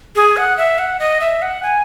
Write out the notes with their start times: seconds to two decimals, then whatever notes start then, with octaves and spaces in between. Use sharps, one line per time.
0.16 G#4
0.37 F#5
0.57 E5
0.79 F#5
0.99 D#5
1.20 E5
1.42 F#5
1.63 G#5